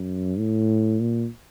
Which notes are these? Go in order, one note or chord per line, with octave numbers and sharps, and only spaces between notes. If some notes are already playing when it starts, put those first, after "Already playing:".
Already playing: F#2
A2
A#2